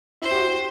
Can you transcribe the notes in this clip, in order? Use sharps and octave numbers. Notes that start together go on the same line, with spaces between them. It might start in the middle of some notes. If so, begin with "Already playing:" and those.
E4 C5
G4
F#4
G4